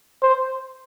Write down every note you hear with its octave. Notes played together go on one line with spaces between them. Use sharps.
C5